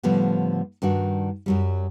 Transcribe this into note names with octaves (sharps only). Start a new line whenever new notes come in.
A2 D3 F3 G3 A3 B3
G2 D#3 D4 F#4
F#2 F#3 G3